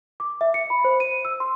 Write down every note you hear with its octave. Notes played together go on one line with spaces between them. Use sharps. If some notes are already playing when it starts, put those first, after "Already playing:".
D6
E5
C#7
B5
C5
D#7
E6
C6